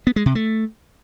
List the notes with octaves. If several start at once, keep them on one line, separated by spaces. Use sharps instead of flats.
B3
G#3
C3
A3